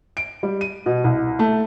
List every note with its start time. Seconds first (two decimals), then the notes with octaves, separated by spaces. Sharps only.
0.17 D7
0.43 G3
0.61 D#7
0.86 B2
1.04 C2
1.39 A3